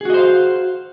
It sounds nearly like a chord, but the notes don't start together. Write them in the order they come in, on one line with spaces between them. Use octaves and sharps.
G#4 F#4 D#5 C5 F5